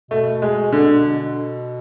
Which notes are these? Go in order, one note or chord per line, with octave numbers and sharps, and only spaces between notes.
B2 A3
G#3
D3